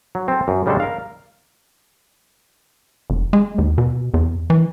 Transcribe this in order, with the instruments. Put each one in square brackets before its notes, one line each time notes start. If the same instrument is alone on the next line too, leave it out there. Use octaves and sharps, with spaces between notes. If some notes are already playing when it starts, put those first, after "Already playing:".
[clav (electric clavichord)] F#3
C4 A4
F#2
C#3 G3 G#3 D4 A4
A#4 F5
[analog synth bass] F1
G#3
D#2
B2
E2
E3